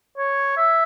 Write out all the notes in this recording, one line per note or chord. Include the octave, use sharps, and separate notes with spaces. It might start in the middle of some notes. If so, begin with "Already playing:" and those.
C#5
E5